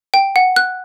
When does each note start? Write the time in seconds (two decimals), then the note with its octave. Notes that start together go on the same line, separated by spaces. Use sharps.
0.14 G5
0.36 F#5
0.56 F#6